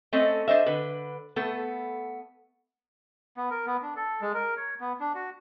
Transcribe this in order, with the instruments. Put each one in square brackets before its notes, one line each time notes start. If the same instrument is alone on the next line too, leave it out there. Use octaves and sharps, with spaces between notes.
[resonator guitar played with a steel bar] A3 C4 C#4 A4 D#5
D4 C5 D#5 E5
D3 B4
A3 B3 A4
[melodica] B3
A#4
B3
D4
A4
G#3
A#4
C#5
B3
D4
F#4